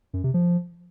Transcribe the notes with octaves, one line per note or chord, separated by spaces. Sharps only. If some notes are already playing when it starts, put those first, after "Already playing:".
F#2
C3
F3